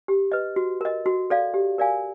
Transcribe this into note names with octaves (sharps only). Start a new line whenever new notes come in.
G4
B4 D#5
F#4
A#4 D#5
F#4
A4 D5 F5
G4
A#4 D5 F5 G#5